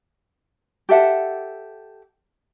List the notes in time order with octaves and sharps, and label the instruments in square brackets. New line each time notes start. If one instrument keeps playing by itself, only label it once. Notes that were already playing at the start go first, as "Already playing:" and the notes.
[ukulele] G4 A4 E5 F#5